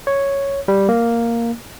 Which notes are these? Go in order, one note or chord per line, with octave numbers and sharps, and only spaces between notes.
C#5
G3
A#3